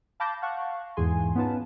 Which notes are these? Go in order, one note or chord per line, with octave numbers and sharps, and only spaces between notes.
F5 A5 B5 D6 G6 A#6
F5 F#5 A5 C#6 F#6
E2 G#2 E3 G#4 G#5 C6
B3 C#4 D#4 F4 B4 A5